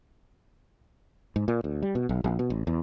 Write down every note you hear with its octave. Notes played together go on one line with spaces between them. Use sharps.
G#2
A#2
D2
G3
B2
B1
A#1
B2
A1
E2